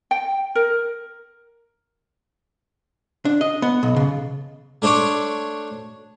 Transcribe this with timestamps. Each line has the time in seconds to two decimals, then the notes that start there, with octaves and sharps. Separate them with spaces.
0.11 G5
0.55 A#4
3.25 D4
3.41 D#5
3.62 B3
3.83 B1
3.96 C#3
4.82 A3 D4 C5 C#5 D6